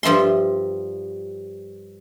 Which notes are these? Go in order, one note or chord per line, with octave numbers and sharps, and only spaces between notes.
G2 F3 E5 C6